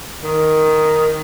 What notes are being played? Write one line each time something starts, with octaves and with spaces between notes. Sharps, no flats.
D#3